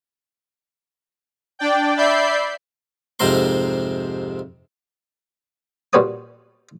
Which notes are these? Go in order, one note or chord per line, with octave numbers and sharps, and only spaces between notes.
D4 D5 G5
D5 E5 B5 G6 C7
F2 G#2 C3 C4 A#5 C6
A#2 G3 F#4 B4 C#5 D#6